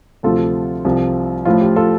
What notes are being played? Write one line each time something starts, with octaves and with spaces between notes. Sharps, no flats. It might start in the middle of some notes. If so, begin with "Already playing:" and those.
D2 C3 F3 F4 A4
C2 C3 F3
A1 A2 F3 F4
G4
F4 A4